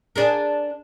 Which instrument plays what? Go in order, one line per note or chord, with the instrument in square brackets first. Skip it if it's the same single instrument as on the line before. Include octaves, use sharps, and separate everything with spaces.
[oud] D4 G#4 A#4